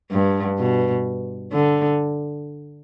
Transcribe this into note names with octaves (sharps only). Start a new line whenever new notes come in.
G2
B2
D3